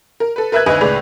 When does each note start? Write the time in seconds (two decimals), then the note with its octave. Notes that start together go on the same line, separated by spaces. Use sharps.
0.20 A#4
0.36 A4 B4
0.52 A#4 B4 E5 E6 F#6 G#6
0.66 G#1 D2 B4 D#5 G#5
0.81 C#2 A2 G#3 B4 D5 F7